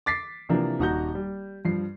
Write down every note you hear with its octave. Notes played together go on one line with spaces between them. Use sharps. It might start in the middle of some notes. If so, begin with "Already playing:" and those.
D6 A6 B6 C7
C3 E3 F3 A#3 D4
D#1 D#4 F#4 F#5 A#5 G6
G3
G2 F3 C7